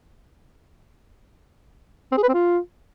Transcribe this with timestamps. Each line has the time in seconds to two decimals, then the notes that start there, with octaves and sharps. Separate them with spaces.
2.12 C4
2.17 G#4
2.23 B4
2.28 C4
2.34 F4